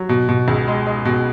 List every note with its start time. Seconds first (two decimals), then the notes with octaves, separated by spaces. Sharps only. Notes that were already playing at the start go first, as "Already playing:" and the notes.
Already playing: F#3
0.09 B2
0.29 B2
0.48 C#2
0.68 G#3
0.87 G#3
1.05 B2